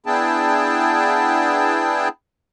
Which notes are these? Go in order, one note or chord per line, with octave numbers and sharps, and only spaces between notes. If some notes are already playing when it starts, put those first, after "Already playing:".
B3 D4 E4 G#4 G5 A5